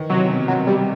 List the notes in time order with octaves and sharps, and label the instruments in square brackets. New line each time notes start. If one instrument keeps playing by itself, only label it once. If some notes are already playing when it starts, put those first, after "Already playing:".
Already playing: [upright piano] D#3 E3
[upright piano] C3 [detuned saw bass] F#3
[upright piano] B2
[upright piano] B2 [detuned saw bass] F#3
[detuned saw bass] G3